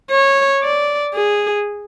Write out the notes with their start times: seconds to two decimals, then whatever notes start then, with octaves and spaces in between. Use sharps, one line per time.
0.11 C#5
0.63 D5
1.15 G#4